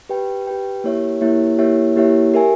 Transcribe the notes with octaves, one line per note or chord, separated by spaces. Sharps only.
G4 B4 G5
G4 B4 G5
A#3 E4 G4 C#5 E5
A#3 E4 G4 C#5 E5
A#3 E4 G4 C#5 E5
A#3 E4 G4 C#5 E5
G4 A#4 E5 G#5